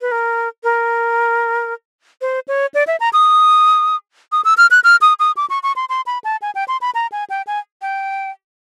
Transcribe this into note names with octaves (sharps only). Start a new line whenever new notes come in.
B4
A#4
A#4
C5
C#5
D5
E5
A#5
D#6
D#6
E6
F6
F#6
F6
D#6
D#6
D6
C#6
C#6
C6
C6
B5
A5
G#5
G5
C6
B5
A#5
G#5
G5
G#5
G5